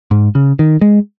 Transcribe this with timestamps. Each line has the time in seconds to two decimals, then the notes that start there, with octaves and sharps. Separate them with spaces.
0.11 G#2
0.35 C#3
0.59 D#3
0.81 G#3